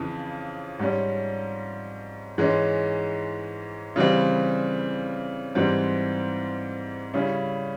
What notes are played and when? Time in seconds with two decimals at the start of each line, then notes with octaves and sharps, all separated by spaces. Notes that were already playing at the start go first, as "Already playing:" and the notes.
Already playing: F2 C#3 E3
0.79 G#2 G3 C#4
2.38 G#2 E3 G#3 C#4
3.96 C#3 E3 G3 C4
5.55 G#2 E3 G3 C4
7.14 C#3 G3 C#4 E4